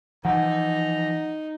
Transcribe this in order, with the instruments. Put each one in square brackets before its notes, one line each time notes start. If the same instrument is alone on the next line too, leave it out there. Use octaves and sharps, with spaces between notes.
[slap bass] E3 F3 [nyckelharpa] D#4 [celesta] F#5 [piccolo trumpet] A#5